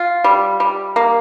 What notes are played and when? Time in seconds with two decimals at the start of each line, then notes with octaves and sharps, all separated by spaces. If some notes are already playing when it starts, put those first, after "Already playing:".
Already playing: F4
0.24 G3
0.60 G3
0.96 A#3